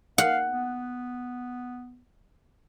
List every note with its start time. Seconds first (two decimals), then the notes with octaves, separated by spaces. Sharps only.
0.18 F5 F#5
0.46 B3